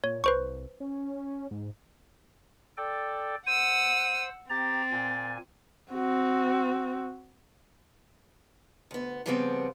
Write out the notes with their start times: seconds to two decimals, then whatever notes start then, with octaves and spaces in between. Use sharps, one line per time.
0.04 A#2 C#5
0.24 C2 B4 C5 C#6
0.80 C#4
1.51 G#2
2.77 A4 D5 G5
3.47 C5 F#5 E6 D#7
4.50 C4 G4 A#5 A6
4.91 A#2 G#5
5.92 C4 F#4
8.91 D2 B3
9.26 C#3 F3 G3 A3 B3 C4